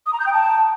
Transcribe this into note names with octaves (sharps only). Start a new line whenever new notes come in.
D#6
A#5
G6
G5
A5